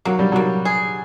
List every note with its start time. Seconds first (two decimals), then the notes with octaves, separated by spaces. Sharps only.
0.05 F#3 A#3
0.19 G3
0.32 F#3 A#3
0.65 G#4